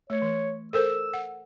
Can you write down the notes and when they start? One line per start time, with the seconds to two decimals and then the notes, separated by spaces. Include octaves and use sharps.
0.10 A3 C#5
0.22 E3
0.73 A4 A#4 C5 E6
1.14 F#5